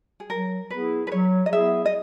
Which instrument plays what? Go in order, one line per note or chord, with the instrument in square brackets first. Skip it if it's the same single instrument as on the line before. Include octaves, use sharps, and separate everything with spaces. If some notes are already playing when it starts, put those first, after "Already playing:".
[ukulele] G#4
[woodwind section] F#3 [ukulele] A#4
[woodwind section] B3 E4 G#4 [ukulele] B4
[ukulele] B4
[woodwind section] F#3 [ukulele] C#5
[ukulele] D#5
[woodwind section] B3 E4 G#4 [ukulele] E5
[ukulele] D#5